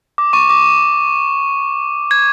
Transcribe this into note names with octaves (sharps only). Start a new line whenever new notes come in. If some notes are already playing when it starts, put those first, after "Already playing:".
D6
C#6
D6
G#6